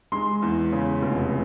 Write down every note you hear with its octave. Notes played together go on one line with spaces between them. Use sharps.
G#3 C6
E2
C#3
F1